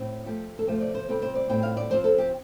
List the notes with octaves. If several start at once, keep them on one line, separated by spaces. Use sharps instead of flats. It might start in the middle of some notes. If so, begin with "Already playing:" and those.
Already playing: A2 C4
F3 A3 F4 G4
A4
C3 F3 A3 F4 C5
D5
C5
C3 G3 C4 F4 A4
C5
D5
A2 G3 C4 F4 G5
F5
D5
F3 C4 F4 C5
A4
G4